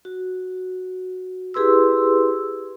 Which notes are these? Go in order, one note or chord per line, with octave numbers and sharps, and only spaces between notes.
F#4
E4 G4 G#4 B4 C6 E6